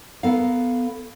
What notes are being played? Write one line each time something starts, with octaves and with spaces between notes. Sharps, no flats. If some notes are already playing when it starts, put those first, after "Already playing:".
B3 A4 A#4 F5